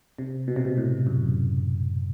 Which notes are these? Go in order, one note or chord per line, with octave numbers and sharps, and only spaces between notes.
C3
B2
C3
B2
A2
F#2